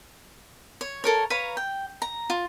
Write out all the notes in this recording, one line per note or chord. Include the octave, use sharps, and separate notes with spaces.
C#5
A4 A#4 C#5
B4 C#5 F5 A#5
G5
A#5
F4